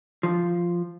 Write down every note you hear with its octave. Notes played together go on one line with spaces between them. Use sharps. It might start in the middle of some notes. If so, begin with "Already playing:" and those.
F3